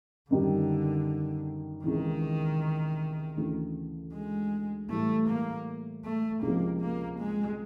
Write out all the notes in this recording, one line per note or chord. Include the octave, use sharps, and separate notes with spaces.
F#2 D3 D#3 G3
C#2 C3 D#3 E3
D2 C#3 E3
G#3
A2 E3 G3 A3
A#3
A3
C#2 C3 F3 A#3
A#3
G#3